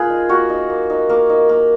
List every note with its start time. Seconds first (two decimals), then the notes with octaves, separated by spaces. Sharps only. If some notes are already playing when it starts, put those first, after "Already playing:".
Already playing: A#3 F4 G#4 B4
0.09 D#4
0.29 A#3 F#4 A#4
0.50 D#4
0.70 A#3
0.90 D#4
1.09 A#3
1.29 D#4
1.49 A#3